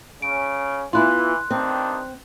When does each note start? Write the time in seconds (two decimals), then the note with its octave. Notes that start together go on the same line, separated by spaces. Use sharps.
0.22 C#3 C#4 D7
0.93 E3 B3 E4 F4 C6 F#6
1.51 G2 D#3 C4 D4